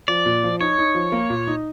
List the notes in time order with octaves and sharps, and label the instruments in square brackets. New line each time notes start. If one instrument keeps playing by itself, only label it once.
[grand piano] F3 [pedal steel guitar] D5
[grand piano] A#2
F3
[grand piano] D#4 [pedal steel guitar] C#5
[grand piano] D#4
F3
A#3
A#2
D#4